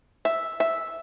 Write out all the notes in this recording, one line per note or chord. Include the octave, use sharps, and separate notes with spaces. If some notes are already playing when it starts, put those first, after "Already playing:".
E5
E5